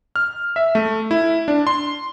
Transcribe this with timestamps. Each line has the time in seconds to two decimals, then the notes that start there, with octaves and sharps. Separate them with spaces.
0.16 F6
0.56 E5
0.75 A3
1.11 E4
1.48 D4
1.67 C6